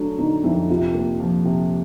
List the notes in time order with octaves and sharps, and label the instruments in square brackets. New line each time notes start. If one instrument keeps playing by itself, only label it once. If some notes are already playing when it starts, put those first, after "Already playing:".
Already playing: [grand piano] F#3 A3 [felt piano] D4
[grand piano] D3 [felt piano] D#4
[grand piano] F2 [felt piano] E4
[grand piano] C3 [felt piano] F4
[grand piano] A#3
F3
C3